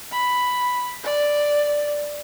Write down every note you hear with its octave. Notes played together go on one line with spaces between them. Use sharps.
B5
D5